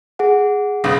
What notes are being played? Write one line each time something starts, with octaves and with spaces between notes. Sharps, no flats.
G#4 F#5
B1 C#3